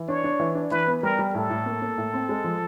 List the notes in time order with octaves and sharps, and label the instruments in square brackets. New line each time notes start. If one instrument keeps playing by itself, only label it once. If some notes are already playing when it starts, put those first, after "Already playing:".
Already playing: [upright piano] E3
[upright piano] D4 [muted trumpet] C#5
[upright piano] D4
E3
D4
[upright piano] E3 [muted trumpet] B4
[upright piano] B3
[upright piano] G3 [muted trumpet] A#4
[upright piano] G3
[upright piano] A2 [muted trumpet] A4
[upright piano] A2
A#3
A#3
A2
C4
G#3
F3